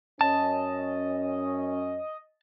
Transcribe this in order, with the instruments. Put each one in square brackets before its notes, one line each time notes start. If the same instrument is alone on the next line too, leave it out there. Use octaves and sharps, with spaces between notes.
[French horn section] F#2 C#4 [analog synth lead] D#5 [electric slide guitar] A5